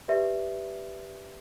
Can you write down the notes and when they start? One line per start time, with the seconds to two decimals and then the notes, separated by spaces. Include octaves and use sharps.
0.08 G4 B4 D5 E5